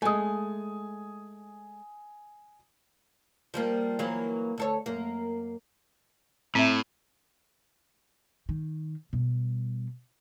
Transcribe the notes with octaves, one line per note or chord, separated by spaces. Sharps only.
G#3 A3 G#5 D#6
F3 G3 A#3
E3 F#3 A#3
D2 A4 C#5
F#2 A#3
A2 C4 E5
D#3
B2 G3